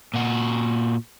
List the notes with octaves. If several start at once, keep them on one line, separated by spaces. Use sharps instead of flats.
A#2 F#4